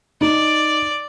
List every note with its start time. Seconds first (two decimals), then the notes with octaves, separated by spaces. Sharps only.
0.21 D#4 D5